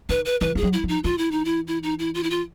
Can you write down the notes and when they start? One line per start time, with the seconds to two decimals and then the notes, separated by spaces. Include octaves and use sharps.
0.09 D#3 B4
0.25 B4
0.41 E3 B4
0.55 F3 G#4
0.63 F#3
0.73 E4
0.84 F3 D#4
1.04 E3 F4
1.18 E4
1.31 D#4
1.45 E4
1.67 E4
1.83 D#4
1.99 E4
2.15 F4
2.23 E4
2.30 F4